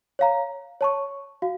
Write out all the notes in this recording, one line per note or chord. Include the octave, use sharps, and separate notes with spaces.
C#5 F5 A#5
C#5 A5 C#6
F#4 F5